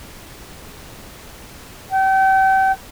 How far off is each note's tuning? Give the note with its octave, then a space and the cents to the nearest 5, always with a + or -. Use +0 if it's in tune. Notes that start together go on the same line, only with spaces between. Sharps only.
G5 -35